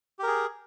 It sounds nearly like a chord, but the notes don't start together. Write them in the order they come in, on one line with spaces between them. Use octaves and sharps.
G4 A#4 G#4